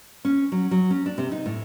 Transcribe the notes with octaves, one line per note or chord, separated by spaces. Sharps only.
C#4
F#3
F#3
C#4
D4
C3
D#4
A2